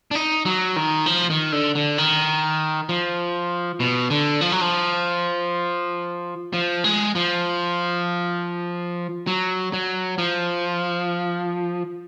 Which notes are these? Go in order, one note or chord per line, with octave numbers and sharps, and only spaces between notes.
D4
D#4
F#3
D#3
F3
D#3
D3
D3
D#3
F3
B2
D3
F3
F#3
F3
F3
G#3
F3
F#3
F#3
F3